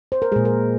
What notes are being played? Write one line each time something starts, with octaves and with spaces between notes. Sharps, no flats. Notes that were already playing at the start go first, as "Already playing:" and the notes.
C5
A#4
A#2 G#3 G#4
A#4